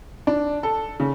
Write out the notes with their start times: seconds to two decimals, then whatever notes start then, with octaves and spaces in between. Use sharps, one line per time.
0.27 D4
0.63 A4
1.00 C#3